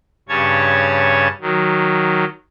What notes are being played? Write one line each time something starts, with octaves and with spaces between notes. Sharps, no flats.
G2 C#3 C#4 C#5 A5 G#6
D#3 F#3